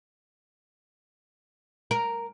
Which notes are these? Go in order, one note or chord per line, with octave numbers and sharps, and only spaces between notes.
A#4